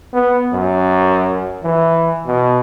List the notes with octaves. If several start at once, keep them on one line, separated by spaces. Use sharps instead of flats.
B3
F#2
E3
B2